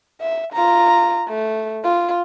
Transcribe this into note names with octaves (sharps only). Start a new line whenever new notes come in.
E5
F4 A#5
A3
F4